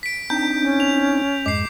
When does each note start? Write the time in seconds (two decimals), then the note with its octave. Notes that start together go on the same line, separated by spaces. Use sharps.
0.03 B6 D7
0.30 C4 D4 D#4 G6
0.62 C#4
0.80 F7
1.46 F2 G#2 G#3 D6 C7